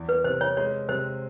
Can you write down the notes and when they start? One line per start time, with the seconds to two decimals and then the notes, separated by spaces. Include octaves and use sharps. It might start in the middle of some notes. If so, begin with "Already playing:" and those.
Already playing: E2
0.09 B4
0.24 C3 C5
0.41 C#5
0.57 G#3 C#5
0.89 C3 C5